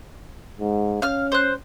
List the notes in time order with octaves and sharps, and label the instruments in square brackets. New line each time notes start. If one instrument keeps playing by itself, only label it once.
[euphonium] G#2
[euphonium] C#4 [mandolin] F5 F6
[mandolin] C5 F#6